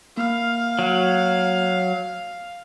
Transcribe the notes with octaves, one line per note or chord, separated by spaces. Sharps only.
A#3 F5 F6
F#3